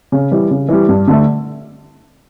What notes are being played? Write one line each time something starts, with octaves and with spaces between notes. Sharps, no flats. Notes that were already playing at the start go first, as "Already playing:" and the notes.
C#3
E3 G3
C#3
E3 G3
G2
D3 A3